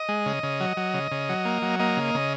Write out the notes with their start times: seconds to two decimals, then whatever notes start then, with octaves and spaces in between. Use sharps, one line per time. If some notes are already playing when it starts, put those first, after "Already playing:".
Already playing: D#5
0.09 G#3
0.26 C#3
0.43 C#3
0.60 F#3
0.77 F#3
0.94 C#3
1.12 C#3
1.29 F#3
1.45 A#3
1.62 F#3
1.79 A#3 D#5
1.97 C#3
2.15 C#3